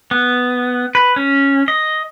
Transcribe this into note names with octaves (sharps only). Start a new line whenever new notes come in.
B3
B4
C#4
D#5